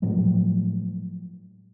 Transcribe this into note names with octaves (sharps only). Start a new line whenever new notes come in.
A2 F3 F#3 G#3